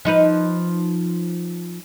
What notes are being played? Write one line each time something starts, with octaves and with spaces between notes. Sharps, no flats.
F3 D#4 B4